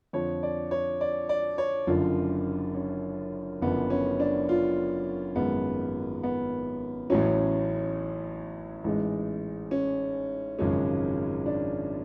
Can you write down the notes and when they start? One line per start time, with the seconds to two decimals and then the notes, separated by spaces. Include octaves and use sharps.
0.13 F2 D3 F3 C#5
0.43 D5
0.71 C#5
1.01 D5
1.29 D5
1.58 C#5
1.87 F#1 F#2 D3 F3 F4
2.75 C#4
3.61 F#1 F#2 D3 F3 B3
3.90 C#4
4.20 D4
4.49 F4
5.36 G#1 F#2 F3 G#3 B3
6.23 B3
7.10 A1 A2 F#3 C#4
8.84 A1 G#2 G#3
9.71 C#4
10.58 G#1 F#2 C#3 F3 G#3 C#4
11.46 D4